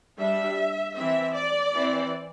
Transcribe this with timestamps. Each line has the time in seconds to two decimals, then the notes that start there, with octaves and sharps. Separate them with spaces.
0.19 G3 D4 E5
0.96 E3 C4 E5
1.35 D5
1.75 E3 C4